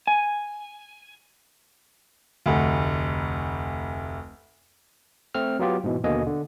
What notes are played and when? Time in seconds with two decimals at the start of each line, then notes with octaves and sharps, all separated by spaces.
0.07 G#5
2.46 F1 D2
5.34 A3 C4 F6
5.59 F#3 B3 F4 G4
5.84 G#2 B2 E3
6.04 D#2 B2 D3 A#3 D#5 G#5
6.27 D3